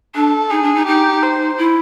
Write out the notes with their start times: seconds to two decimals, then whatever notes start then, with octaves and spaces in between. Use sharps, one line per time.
0.15 D4 A4
0.51 D#4 G#4
0.63 D4
0.75 D#4
0.87 D#4 G4
1.23 C5
1.58 E4